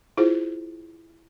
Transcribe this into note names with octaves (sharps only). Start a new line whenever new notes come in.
E4 F4 G#4 C5